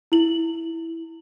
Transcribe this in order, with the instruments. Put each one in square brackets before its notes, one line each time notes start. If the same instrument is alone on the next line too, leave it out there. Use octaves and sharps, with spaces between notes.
[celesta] E4 F#7